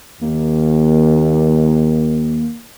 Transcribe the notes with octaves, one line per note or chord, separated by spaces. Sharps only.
D#2 A#3